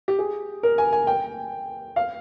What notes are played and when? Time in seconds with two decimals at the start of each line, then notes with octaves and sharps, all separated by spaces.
0.08 G4
0.19 G#4
0.63 A#4
0.78 G#5
0.93 G#5
1.07 G5
1.96 F5